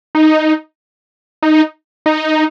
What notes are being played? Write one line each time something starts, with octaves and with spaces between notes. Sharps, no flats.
D#4
D#4
D#4